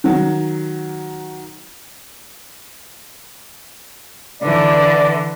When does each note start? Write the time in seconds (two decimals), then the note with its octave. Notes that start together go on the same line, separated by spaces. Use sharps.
0.04 D#3 F#3
4.43 D3 E3 D5